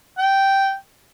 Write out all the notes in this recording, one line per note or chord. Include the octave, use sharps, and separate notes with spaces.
G5